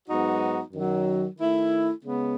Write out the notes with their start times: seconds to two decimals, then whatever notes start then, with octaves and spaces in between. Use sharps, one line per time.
0.08 G#2 F#3 B3 D#4 F#4
0.73 F#2 D#3 F#3
1.39 D#3 A3 E4
2.04 C#3 G#3 B3